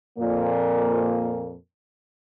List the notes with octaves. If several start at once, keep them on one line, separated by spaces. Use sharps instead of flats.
F2 A#2 A#3